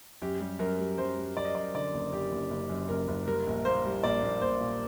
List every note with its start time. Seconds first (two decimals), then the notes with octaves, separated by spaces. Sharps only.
0.22 F#2 G4
0.40 G3
0.59 F#2 A#4
0.79 G3
0.98 F#2 C5
1.17 G3
1.36 F#2 D5
1.45 D#5
1.55 F#2 D5
1.74 D3 D5
1.94 F#1
2.12 F#2 G4
2.32 F#1
2.50 F#1
2.69 F#2
2.89 F#1 A#4
3.08 F#1
3.27 G3 A#4
3.47 A#1
3.65 A#3 C5
3.85 G3
4.03 A#1 D5
4.22 A#1
4.41 A#1 C5
4.60 A#2